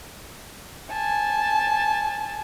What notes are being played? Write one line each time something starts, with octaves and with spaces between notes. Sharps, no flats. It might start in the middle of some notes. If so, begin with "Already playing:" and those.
G#5 A5